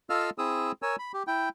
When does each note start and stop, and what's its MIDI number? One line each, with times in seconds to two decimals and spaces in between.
0.10 0.30 65
0.10 0.30 69
0.10 0.30 75
0.10 0.30 77
0.10 0.30 88
0.10 0.30 89
0.38 0.72 60
0.38 0.72 64
0.38 0.72 68
0.38 0.72 87
0.38 0.72 88
0.82 0.96 70
0.82 0.96 73
0.82 0.96 80
0.82 0.96 88
0.99 1.12 83
1.14 1.23 67
1.27 1.49 64
1.27 1.49 79